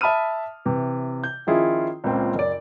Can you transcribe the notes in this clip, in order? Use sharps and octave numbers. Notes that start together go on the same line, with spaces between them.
E5 A5 B5 D#6 F6 D#7
C3 E3
G6
D#3 F3 C#4 E4 F4 G#4
C#2 A#2 A#3 C4 C#4
F#1 D5